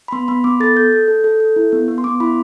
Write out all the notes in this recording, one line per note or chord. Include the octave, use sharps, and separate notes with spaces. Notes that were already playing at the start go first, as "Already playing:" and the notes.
B5
B3 C6
B3 B5
B3 D6
A4 A6
A4 G6
A4
A4
A4
A4
E4
B3
B3
C6
B3 D6
E4 B5